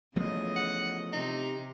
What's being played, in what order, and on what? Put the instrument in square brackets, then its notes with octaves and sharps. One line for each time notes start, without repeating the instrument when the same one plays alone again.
[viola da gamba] C#3 E3 D#5 [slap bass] F3 A3 B3
[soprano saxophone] F#5
[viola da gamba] C3 [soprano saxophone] D#4